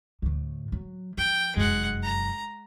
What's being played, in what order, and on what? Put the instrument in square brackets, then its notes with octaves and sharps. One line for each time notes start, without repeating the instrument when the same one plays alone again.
[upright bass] D2 A2
F#3
[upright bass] F3 [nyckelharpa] G5
[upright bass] F1 F#2 [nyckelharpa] G#3 F#5
[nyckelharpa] A#5